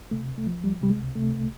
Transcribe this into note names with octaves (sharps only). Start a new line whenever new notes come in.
C3 A3
C#2
A3
F3
C#2 G3
C3 G3
G#3
C#2
C3 A3
C2